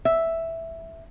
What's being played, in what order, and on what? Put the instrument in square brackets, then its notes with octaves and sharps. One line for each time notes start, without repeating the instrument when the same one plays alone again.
[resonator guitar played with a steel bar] E5